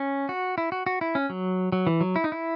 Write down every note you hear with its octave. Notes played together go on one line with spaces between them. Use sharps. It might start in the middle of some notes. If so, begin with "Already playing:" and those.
Already playing: C#4
F#4
E4
F#4
F#4
E4
C#4
F#3
F#3
E3
F#3
E4
D#4
E4